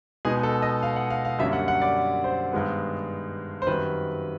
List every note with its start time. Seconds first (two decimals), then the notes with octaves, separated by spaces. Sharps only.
0.25 B2 G#3 B3 D#4 G#4
0.43 A4
0.62 D#5
0.83 F5
0.96 F#5
1.10 F5
1.25 F5
1.39 F#2 D3 G3 A#3 C#4 E5
1.53 F#5
1.68 F#5
1.82 D5
2.24 C5
2.53 G2 D#3 G#3 B3
3.62 C5
3.67 F#2 D#3 G3 C4 B4